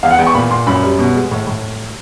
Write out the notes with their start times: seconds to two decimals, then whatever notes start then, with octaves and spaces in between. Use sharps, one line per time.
0.03 E2 F5
0.10 F#5
0.18 E2 G5
0.27 C#6
0.35 A#2 B5
0.51 A#2 C6
0.67 F#2 B5
0.83 G3
0.99 B2
1.15 G#3
1.31 A2
1.47 A2